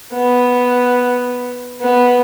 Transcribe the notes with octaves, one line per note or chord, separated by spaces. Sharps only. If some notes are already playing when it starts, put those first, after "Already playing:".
B3
B3